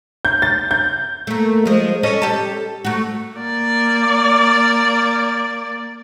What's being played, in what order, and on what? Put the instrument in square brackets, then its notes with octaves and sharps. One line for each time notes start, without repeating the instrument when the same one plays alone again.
[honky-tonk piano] G6
A6
G6
[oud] A3 A#3
F3 G#3
C#4 A4 D#5
G4 A4
A3 F#4
[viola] A#3 D5